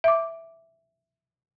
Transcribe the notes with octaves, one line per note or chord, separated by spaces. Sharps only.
E5 D6